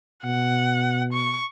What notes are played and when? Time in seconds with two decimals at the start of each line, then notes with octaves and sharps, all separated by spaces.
0.24 B2 F#5
1.13 C#6